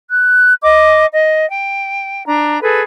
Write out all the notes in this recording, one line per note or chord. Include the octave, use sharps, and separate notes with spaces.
F#6
D#5 D6
D#5
G5
D4 A#5
G#4 A4 B4